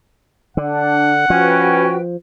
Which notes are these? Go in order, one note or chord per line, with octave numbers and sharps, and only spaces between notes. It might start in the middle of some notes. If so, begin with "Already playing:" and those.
D3 D4 F#5
F3 C#4 F#4 B4 G5